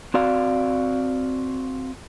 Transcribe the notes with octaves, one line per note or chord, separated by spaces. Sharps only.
C4 F#4 D5 F5